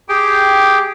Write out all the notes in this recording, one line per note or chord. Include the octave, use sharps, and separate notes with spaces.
G4 G#4 G5